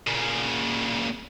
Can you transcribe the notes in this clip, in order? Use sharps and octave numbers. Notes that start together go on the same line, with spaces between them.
A#2 C#3